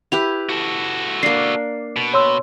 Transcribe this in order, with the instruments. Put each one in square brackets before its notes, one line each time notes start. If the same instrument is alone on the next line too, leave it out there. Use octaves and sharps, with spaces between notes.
[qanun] E4 G4 B4 [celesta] F7
[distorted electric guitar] F#4 A4
[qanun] A#3 D4 [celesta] C7
[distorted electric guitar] B2
[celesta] C#5 C6 E6